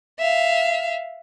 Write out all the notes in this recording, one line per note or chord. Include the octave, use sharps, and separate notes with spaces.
E5 F5